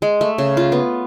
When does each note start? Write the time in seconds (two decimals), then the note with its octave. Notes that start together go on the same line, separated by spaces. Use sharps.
0.02 G#3
0.21 A3
0.38 C#3
0.57 F4
0.72 B3